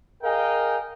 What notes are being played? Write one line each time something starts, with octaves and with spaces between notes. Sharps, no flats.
G#4 A#4 D#5 F5 G5